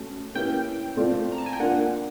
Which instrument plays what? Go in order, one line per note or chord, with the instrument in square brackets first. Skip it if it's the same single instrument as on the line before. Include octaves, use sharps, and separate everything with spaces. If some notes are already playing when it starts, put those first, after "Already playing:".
Already playing: [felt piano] A3 C#4 F#4
[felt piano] A#3 C#4 E4 G4 B4 [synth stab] G5
[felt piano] A3 C4 F4 A4 D5
[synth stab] A#5
A5
G#5
G5
[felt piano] A#3 D4 F4 [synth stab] F#5